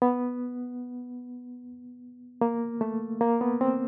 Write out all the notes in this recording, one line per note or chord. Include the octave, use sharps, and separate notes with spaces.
B3
A#3
A3
A#3
B3
C4